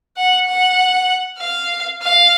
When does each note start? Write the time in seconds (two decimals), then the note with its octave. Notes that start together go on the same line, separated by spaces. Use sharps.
0.17 F#5
0.48 F#5
1.40 F5
2.02 F5